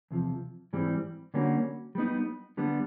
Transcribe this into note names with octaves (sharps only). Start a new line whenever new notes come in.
E2 C3 F3
G#2 E3 G3 C4
D3 G3 A#3 C#4 F#4
G3 B3 D#4
D3 G3 B3